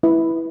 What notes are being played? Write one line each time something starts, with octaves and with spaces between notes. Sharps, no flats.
E4 B4